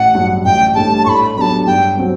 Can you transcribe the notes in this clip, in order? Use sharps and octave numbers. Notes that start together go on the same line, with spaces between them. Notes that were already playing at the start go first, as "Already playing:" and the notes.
Already playing: A1 F#5
G2 F#3
A1 G5
A2 G3 D4 A5
A5
A2 B5 C#6
F#3 B3 D4 G4 A5 B5
G2 G5
F#3 C4 F#4